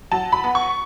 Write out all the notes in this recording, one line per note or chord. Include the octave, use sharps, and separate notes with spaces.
F#3 A5
B5
B3
C#6